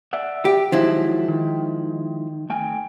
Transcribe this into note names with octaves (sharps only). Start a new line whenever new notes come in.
D5 E5 F#5
G4
D#3 F3 F#3 G#3 E4
D#3
A3 G5 G#5